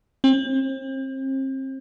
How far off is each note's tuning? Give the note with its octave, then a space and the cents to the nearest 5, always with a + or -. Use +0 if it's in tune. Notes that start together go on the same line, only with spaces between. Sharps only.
C4 +35